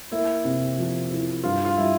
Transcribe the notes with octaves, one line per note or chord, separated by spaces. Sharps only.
A#3 E4
C3
F3
E4
G2 F4
F4
G3 E4